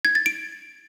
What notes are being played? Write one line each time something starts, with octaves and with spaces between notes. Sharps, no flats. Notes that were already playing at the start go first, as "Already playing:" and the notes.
G#6
A6
D7